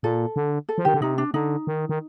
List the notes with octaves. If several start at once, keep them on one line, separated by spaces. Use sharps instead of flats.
A#2 A4
D3
A4
F3
D#3 G4
D3
C3 D#4
D4
D3 D#4
D#3
D#3